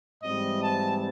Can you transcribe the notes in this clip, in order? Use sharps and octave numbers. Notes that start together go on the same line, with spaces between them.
G#2 E3 G3 C4 D#5
A5